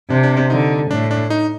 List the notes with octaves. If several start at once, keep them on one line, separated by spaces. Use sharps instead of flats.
C3 D4
D4
D4
D3 D#4
A2 D4
D4
D#4